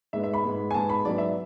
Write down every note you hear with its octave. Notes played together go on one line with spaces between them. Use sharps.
G#2 G#3 B3 E5
E5
B5
G#2 G#3 B3
G#5
G#2 G#3 B3 A5
B5
G#2 F#3 B3 D5
E5